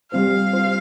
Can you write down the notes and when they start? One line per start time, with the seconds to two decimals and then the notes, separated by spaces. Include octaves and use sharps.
0.11 G3 C4 F4 C5 F5
0.53 G3 C4 F4 C5